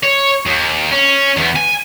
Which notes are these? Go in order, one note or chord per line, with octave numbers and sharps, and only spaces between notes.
C#5
D#2
C#4
E2 B3
G#5